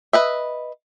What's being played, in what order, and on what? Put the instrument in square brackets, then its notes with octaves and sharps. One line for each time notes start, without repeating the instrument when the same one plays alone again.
[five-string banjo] B4 D#5 E5